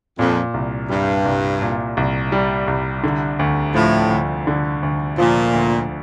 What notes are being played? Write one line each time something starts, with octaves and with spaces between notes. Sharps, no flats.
F2 A#2
C2
G2 G3
C2
A#2
C2
G3
C2
D3
D2
A2 F3
D2
D3
D2
A#2 F3
D2